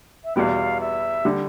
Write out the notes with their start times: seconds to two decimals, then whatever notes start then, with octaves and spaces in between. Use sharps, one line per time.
0.24 E5
0.35 E2 B2 G3 B3 F5 G5
0.80 E5
1.25 D3 G3